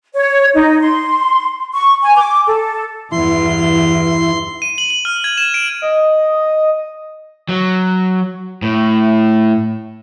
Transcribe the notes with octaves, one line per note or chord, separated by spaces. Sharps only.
C#5
D#4
C6
C#6
G#5
D6
A4
E2 G2 E3 E4 C6
D#7
F#7
F#7
F6
G#6
E7
D7
D#5
F#3
A2